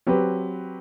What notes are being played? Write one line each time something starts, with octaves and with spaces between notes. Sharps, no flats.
F#3 C4 G4 B4